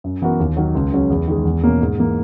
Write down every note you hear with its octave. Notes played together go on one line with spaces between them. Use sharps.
F#2
E3 B3 F#4 A#4
D#2
D#3 F#3
C#2
C#3 F#3 C#4
E2
D#3 G#3
E2
B2 A#3 C#4
G#2
E3 A#3